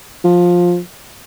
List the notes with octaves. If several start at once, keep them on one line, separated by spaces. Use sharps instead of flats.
F3